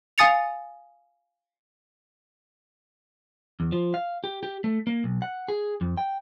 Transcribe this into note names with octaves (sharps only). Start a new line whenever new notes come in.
F5 G#5 D#6 A6 C#7 F7
E2
F3
F5
G4
G4
A3
A#3
B1
F#5
G#4
F2
G5